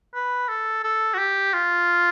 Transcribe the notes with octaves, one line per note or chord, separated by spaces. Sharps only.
B4
A4
A4
F#4
G4
F4